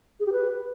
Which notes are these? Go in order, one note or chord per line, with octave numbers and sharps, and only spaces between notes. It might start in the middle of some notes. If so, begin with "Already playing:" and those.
G#4
G4
B4